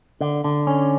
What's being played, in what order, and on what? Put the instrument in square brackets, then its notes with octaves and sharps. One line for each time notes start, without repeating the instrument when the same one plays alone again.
[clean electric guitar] D3
D3
C#4